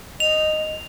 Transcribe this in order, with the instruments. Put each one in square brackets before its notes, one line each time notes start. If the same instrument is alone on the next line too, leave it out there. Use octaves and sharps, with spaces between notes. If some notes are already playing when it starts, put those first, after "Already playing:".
[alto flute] D#5 [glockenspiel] F7